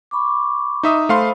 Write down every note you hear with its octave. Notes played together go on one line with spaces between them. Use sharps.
B5 C#6 D6
D#4 E5 D#6
A3 C5 F5 B5 C6